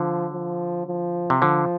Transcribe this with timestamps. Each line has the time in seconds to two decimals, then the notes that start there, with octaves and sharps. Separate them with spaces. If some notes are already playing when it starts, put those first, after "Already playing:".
Already playing: D3 F3
0.33 F3
0.87 F3
1.30 C3
1.42 D3 F3